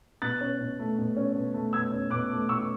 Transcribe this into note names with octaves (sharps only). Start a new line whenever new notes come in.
B2 F#6 A6
C#4
B2
A3
B2
C#4
B2
A3
B2 E6 G#6
C#4
B2 D6 F#6
A3
B2 C#6 E6